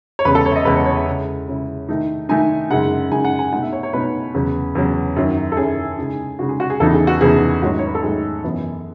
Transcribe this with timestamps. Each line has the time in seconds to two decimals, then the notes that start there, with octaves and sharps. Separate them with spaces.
0.19 C#5
0.25 E2 C#3 G#3 B4
0.35 A4
0.46 C#5
0.51 E5
0.56 D#5
0.65 E2 C#3 G#3 B4
0.76 C#5
0.86 C#5
0.96 E5
1.06 C#3 G#3 C#4 E4
1.48 C#3 G#3 C#4 E4
1.89 D#3 A3 D#4
2.29 D#3 A3 D#4 G#5
2.70 F#2 C#3 G#3 D#4 F#5
3.11 F#2 C#3 G#3 D#4 G#5
3.25 F#5
3.39 G#5
3.52 B2 A3 D#4 F#5
3.62 E5
3.73 C#5
3.83 C#5
3.93 B2 A3 D#4 B4
4.34 E2 C#3 F#3
4.75 E2 C#3 F#3
5.16 F#2 D#3 F#3 C#4 E4
5.52 A4
5.57 F#2 D#3 F#3 C#4 E4 G#4
5.98 C#3 G#3 D#4
6.39 C#3 G#3 D#4 F#4
6.49 G#4
6.60 F#4
6.70 G#4
6.80 E2 C#3 E3 B3 D#4 A4
6.93 G#4
7.07 F#4
7.21 E2 C#3 E3 B3 D#4 G#4
7.62 G#2 D#3 F#3 A3 C#4 F#4
7.79 C#5
7.87 B4
7.95 A4
8.03 G#2 D#3 F#3 A3 C#4 G#4
8.44 F#2 E3 B3